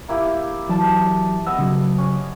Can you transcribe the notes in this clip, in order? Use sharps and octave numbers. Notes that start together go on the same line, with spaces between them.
A#3 E4 G4
E3 F#3 G3 A5
B3 D#5 E6
C#3 F#3
C#4